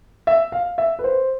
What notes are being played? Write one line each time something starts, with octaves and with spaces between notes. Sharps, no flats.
E5
F5
E5
B4
C5